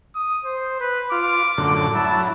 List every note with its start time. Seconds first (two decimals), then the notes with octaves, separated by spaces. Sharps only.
0.15 D#6
0.45 C5
0.80 B4
1.12 F4 D6
1.58 F#2 A2 D3
1.95 F#3 E4 A5